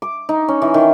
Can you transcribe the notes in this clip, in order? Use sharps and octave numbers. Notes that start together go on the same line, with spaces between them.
D6
D#4
C#4
E3
D#3